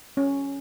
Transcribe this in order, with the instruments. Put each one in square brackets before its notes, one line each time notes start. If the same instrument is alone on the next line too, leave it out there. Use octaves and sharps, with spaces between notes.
[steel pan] C#4